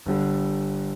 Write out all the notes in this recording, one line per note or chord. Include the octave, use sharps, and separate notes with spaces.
G1 G2 D3 G3